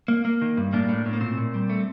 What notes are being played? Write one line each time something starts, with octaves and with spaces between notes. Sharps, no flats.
A#3
A#3
D#3
G2
A2 A#3 D4
A2
A2
A#3
A#2 C4
A#2
G3
A3